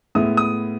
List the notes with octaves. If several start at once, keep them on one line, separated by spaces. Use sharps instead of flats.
A2 G#3 B3 E4 D#6
D#6